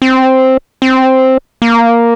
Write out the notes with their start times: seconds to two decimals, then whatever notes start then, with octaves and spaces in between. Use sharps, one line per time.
0.02 C4
0.82 C4
1.62 A#3